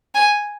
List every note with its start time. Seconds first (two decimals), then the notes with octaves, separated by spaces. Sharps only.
0.15 G#5